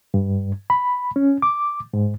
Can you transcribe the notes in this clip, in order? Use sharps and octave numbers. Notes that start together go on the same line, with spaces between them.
G2
B5
C#4
D6
G#2